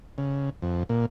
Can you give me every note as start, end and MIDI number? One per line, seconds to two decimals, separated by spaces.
0.18 0.50 49
0.62 0.83 41
0.89 1.06 46